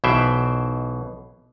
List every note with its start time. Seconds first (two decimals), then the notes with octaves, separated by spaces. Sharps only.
0.04 B1 B2 E3 C5 E5 G5